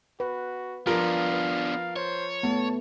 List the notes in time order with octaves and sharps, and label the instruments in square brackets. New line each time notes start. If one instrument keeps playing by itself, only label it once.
[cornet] F#4 [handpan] B4
[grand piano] F3 A#4 [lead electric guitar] B3 D4 [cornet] F5
[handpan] B4
[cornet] C5 [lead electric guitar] C#5
[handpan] A3 B3 [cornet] A5